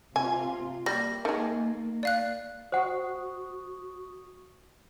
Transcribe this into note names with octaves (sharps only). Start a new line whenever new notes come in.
C3 F4 G#5
G3 A#3 A#6
D#3 G#3
D5 F5 F#6
F#4 C5 F#5 C#6 D#6